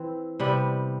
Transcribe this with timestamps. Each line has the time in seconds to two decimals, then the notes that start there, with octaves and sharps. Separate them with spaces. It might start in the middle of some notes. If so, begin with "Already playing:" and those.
Already playing: E3 C4
0.39 C3 G3 B3